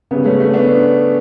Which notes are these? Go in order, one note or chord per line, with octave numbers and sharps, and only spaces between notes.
C#3 G3 B3
A3 C#4
A3
B3 D4